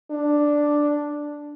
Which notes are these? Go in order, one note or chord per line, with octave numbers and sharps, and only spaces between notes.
D4